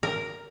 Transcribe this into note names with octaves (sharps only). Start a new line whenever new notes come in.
A#4